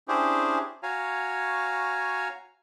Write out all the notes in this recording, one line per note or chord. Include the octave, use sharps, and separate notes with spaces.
C#4 D4 E4 G4 G#4 C5
F#4 C#5 F5 G#5 A#5